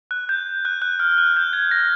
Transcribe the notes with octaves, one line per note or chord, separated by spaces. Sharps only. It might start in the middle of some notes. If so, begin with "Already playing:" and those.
F#6
G6
F#6
F#6
F6
F#6
G6
G#6
A#6